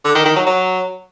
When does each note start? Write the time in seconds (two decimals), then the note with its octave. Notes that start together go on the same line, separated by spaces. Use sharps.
0.04 D3
0.15 D#3
0.25 D#3
0.36 F#3
0.46 F#3